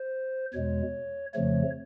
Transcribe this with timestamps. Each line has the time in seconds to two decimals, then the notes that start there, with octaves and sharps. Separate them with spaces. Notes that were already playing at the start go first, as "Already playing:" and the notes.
Already playing: C5
0.53 E2 B2 G#3 C#5
1.34 F2 C#3 F3 A3 C#5